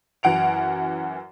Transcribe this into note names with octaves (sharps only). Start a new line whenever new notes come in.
F#2 E3 F#5 D7 F7